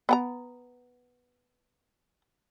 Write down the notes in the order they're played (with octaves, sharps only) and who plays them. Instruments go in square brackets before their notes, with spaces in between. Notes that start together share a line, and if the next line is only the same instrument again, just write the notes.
[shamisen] B3 F#5 A#5